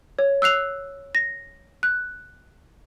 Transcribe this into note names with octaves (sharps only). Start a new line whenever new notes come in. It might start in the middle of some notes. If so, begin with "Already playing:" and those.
C#5
E6 F#6 C7 F7
A#6
F#6